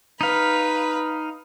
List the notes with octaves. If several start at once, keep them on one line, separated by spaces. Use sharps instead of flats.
D#4 B4 F5 B5